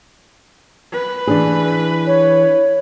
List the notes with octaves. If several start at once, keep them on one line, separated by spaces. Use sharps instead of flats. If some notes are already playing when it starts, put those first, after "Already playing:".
B4
E3 D4 G#4
C#5